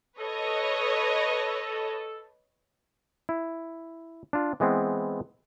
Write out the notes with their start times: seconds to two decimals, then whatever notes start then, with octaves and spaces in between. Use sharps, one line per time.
0.19 A4 B4 C#5 D#5
3.29 E4
4.33 D4 F4
4.60 E3 G#3 B3 C4